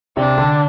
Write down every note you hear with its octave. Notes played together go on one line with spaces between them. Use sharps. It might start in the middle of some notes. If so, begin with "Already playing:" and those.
C3 D4
D3